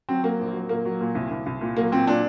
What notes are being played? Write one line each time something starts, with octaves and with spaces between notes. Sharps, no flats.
F#3 C4
F#3 A#3
A#1
F#3
A#2 A#3
F#3
A#2
C2
C2
C2
A#2
F#3 A#3
A#2 C4
A#2 D4